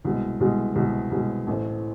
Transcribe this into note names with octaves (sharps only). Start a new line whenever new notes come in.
C2 B2 G#3
C2 B2 G#3
C2 B2 G#3
C2 B2 G#3
A1 A2 E3 A3 C4